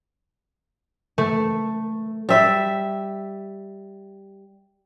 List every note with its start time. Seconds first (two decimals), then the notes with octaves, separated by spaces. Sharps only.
1.18 A3
2.29 G3 E5